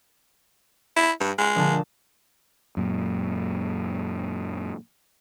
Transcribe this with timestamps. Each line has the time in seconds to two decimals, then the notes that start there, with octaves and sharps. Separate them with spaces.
0.96 E4
1.21 G2 D7
1.38 G#3
1.55 A#1 D3 A5
2.77 F#2 A#2